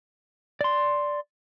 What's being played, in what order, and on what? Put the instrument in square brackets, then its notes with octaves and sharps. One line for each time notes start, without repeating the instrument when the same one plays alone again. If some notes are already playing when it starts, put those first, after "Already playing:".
[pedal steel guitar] D5 C6